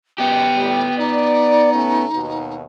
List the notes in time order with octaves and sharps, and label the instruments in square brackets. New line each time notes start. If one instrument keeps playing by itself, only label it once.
[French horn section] F#2 B2 [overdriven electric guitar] B3 G4 [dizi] G5
[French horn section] A2 G3
[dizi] D#4 [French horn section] D5
[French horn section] B2 A3 C#4
D#2 B2